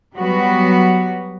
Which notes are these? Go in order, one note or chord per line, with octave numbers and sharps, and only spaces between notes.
F#3 G3 B3 F#4